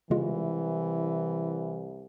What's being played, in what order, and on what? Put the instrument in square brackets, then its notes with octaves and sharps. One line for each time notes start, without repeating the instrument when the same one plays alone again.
[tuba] C2 [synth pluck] C#3 G#3 F4 [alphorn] E3